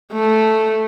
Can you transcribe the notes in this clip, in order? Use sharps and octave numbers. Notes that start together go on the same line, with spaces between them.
A3